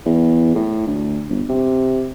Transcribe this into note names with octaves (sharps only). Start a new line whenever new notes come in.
E2
A2
D2
G1
C3